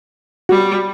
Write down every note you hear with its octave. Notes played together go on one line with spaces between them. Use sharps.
G3 F#4